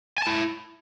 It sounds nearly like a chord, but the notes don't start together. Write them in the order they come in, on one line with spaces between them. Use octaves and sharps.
G#5 A5 E4